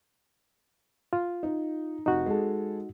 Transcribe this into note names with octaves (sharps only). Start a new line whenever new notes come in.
F4
D#4
F1 D#4 F#4
G#3 G#4 A4